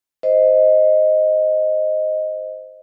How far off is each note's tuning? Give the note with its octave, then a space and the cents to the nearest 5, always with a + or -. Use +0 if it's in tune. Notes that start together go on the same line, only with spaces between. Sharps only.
C5 -5 D#5 +0